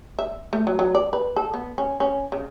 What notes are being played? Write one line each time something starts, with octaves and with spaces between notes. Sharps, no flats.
E5
A3
F#3
F#3
D5
B4
A4
B3
C#4
C#4
C#3